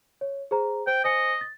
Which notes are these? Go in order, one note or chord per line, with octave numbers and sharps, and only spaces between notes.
C#5
G#4 C5 A#5
C5 G5
C5 D#5 G#5 C#7
A6